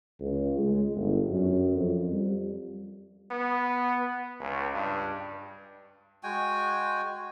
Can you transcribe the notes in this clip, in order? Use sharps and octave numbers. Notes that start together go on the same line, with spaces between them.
C#2
G#3
G1
F#2
F2
G3
B3
C#2
G2
G#3 F#4 G5 G#5